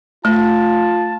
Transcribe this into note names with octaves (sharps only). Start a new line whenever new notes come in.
A3 F4 A5